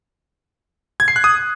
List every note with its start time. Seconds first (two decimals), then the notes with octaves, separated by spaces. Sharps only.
1.00 G#6
1.08 C7
1.16 F#6
1.24 D#6